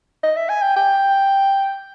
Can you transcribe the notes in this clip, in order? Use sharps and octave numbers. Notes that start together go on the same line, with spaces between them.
D#5
E5
G#5
G5
G5